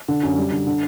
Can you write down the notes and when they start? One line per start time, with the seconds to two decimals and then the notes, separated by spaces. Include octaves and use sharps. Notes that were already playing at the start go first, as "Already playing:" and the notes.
0.08 D3
0.23 F#2
0.37 G3
0.52 D3
0.67 D3